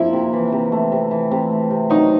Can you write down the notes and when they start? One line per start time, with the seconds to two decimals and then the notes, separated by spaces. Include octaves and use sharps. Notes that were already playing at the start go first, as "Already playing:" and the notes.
Already playing: F3 A#3 E4
0.13 C3
0.33 E3
0.52 C3
0.72 A3
0.92 C3
1.11 E3
1.31 C3
1.50 A3
1.71 C3
1.90 F#3 D#4